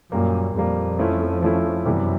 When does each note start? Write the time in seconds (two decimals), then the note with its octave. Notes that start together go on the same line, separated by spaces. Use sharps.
0.12 F#2 A#2 G3 A#3
0.55 F2 A#2 G3 A#3
0.99 F3 A3 C#4 E4
1.42 F3 A3 C#4 E4
1.85 F#2 C3 E3 G3 B3